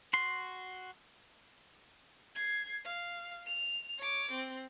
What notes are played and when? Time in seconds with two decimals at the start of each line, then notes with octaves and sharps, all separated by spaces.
0.13 F#4 C6
2.35 G#6 C7
2.84 F5
3.46 F7
3.98 C#5 D6
4.32 C4